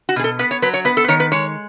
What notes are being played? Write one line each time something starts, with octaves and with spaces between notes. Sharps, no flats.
F#4
B2 G#4
A4
B3 B4
C#5
F#3 B4
C#5
B3 B4
A4
B4
D#3 C#5
B4
G#3 C#5